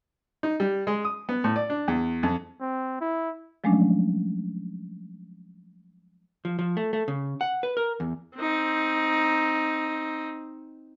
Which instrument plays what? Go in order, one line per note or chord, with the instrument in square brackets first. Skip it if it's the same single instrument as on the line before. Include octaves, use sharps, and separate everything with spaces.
[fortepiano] D#4
G3
G#3
D#6
B3
A2
D5
D4
E2
F2
[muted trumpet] C4
E4
[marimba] F3 F#3 G#3 A3 C#4 D4
[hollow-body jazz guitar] F3
F3
A3
A3
C#3
F#5
B4
A#4
E2
[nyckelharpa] C4 D#4